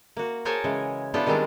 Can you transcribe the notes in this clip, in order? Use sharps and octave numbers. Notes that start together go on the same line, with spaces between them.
A#3 F#4
G#4 A#4 C5 C#5 G#5 A5
C#3 E3 G#3
B3 D4 E4 F4 G4 A4
D#3 G3 G#3 C4 D4 F4